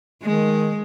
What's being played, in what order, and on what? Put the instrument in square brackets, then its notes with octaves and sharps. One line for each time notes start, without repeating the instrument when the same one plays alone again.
[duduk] D#3 [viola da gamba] G#3